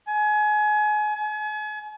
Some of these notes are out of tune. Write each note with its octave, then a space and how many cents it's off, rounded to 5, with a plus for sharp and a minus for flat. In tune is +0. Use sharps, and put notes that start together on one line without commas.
G#5 +30
G#5 +40